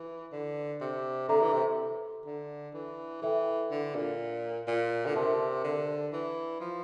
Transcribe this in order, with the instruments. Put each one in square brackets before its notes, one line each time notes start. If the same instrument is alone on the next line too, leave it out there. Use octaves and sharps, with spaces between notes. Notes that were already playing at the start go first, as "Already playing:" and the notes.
Already playing: [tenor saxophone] E3
D3
C3
[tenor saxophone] D3 [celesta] A4 E5 A#5 D6
[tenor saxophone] E3
C3
D3
E3
[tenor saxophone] E3 [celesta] A4 E5 G5
[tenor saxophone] D3
A#2
A#2
D3
[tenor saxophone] C3 [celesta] A#4 E5 A5 C6
[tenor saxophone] D3
E3
F3